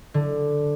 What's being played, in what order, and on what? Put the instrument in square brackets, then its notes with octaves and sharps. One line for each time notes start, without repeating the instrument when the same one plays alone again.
[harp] D3